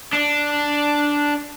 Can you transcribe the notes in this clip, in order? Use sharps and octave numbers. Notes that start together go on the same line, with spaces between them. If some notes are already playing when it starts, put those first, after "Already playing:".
D4